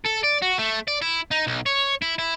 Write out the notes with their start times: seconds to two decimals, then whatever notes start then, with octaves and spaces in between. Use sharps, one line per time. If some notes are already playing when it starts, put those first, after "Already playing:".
0.05 A4
0.23 D5
0.42 F#4
0.58 A3
0.88 D5
1.02 E4
1.31 D#4
1.47 B1
1.66 C#5
2.02 E4
2.18 E4